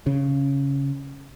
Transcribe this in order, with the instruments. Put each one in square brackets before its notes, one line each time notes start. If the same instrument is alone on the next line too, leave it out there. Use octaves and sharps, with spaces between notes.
[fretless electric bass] C#3